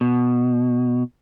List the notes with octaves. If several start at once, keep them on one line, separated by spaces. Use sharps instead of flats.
B2